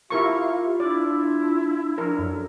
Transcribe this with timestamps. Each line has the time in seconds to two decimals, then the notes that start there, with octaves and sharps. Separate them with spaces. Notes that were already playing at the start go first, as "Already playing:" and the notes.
0.10 E4 F4 G4 A#4 F5 C#6
0.80 D4 E4 D5
1.98 F3 D4 A#4
2.18 F#2 A4